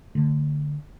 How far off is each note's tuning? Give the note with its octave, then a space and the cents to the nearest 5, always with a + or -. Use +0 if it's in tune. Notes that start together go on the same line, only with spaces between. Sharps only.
D3 +0 A3 +30